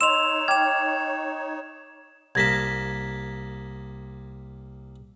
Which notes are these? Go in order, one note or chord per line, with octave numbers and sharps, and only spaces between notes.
D#4 C#5 D#5 C6 E6 E7 F7
G5 D6 F6 G#6 E7
C2 A#3 A5 G#6 A#6 B6